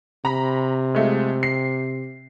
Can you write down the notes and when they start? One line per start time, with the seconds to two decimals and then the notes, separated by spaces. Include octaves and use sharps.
0.25 C3 A#5 B5
0.95 G#3 A3 F4
1.43 C7